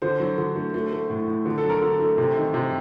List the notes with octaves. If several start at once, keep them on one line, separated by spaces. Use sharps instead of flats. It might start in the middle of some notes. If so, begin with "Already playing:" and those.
D3 C5
F#3
D3
A3
A3
A3
A2
A2
D3
A4
F#3
A#4
D3 A4
A3
C3
D#3
C3